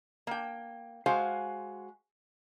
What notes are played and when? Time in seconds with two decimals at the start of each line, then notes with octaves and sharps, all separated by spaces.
0.27 A#3 G5
1.06 G#3 F#4 C5 F5 G#5